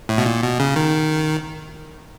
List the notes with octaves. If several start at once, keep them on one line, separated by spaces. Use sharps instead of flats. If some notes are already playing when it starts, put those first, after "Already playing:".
A2
B2
A#2
B2
C#3
D#3